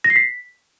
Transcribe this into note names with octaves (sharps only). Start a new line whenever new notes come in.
A#6
C7
B6